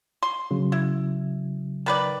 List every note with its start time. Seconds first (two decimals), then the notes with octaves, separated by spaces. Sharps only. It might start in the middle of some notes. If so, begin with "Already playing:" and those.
0.23 C6
0.51 C#3 F#3
0.72 E4
1.86 D#3 B4 D5